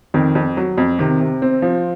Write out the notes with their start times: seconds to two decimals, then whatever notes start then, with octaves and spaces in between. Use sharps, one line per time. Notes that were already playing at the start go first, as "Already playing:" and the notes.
0.14 F2 D#3
0.35 F2
0.57 F#3
0.78 F2
0.99 C3 D#3
1.21 C3
1.42 C4
1.62 F3